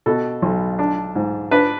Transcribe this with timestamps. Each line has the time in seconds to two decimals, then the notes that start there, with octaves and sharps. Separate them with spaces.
0.06 B2 A4
0.42 B1
0.79 D4
1.15 G#2
1.51 D4 B4